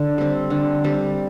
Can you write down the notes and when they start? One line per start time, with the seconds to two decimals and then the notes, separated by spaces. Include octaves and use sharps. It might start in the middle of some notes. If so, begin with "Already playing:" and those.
Already playing: D3
0.18 G3 C4
0.50 D3
0.84 G3 C4